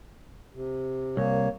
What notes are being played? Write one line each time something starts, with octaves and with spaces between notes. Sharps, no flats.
C3
C2 A#3 C#5